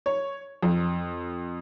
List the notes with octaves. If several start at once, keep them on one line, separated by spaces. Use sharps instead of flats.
C#5
F2